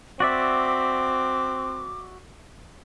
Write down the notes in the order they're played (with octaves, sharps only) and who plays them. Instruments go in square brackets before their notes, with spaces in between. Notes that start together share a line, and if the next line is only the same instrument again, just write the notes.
[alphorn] C4 [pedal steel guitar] F#4 D5 E5 [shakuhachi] D6